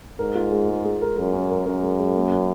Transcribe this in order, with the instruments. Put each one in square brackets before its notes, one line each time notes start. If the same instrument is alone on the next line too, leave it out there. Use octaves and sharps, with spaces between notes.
[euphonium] G#2 [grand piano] A#4
[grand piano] F4
G#3
G#3
G#3
A#4
[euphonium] F#2 [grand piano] A#4
[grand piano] C#4
A#4
[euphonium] F#2 [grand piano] A#4
[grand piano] G#3
G#3
A#3
C#4